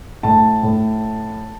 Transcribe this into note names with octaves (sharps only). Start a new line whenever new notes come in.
A2 A5
A2